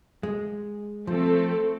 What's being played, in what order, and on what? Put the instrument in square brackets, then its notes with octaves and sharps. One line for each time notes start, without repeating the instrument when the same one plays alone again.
[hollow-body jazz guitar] G#3
[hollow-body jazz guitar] F3 [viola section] A3 C4 A4